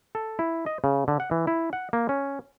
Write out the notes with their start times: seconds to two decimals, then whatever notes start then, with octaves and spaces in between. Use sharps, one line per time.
0.15 A4
0.39 E4
0.66 D#5
0.84 C#3
1.08 D3
1.20 F#5
1.31 E3
1.47 E4
1.73 F#5
1.93 A#3
2.09 C#4